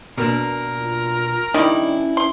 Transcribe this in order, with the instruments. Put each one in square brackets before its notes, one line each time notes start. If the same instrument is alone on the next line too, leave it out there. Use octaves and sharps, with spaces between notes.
[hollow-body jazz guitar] B2 A#3 D4 [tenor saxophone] A#4
[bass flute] F4
[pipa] D#3 G3 [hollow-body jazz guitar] D4 E4
[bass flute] C#4
[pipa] C6